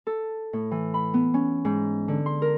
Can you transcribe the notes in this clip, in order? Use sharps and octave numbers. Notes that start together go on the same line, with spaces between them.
A4
A2
E3
B5
B3
C#4
G#2
D3
C6
A#4